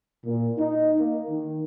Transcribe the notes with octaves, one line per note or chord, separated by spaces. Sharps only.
A#2
D#4
A#3
D#3